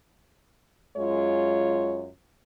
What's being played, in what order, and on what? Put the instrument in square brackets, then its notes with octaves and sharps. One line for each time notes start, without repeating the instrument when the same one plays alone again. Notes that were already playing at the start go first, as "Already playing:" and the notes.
[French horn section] F#2 G#3 F4 C#5